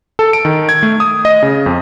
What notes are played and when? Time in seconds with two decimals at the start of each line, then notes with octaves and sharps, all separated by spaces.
0.19 A4
0.33 D7
0.45 D#3
0.69 G#6
0.83 A3
1.00 D#6
1.25 D#5
1.42 C#3
1.66 F2